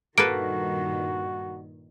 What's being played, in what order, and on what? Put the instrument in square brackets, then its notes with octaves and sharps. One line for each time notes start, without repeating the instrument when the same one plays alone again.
[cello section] G2 A#2 D#3 [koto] A#3 A4 B4 [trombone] F#4 [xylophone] D7